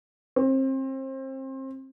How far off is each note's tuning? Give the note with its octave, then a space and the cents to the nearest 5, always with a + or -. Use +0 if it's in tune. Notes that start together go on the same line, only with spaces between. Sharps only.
C4 +30